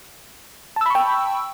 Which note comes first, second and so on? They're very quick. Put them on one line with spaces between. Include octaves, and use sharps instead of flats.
A5 E6 B5 C#6 G5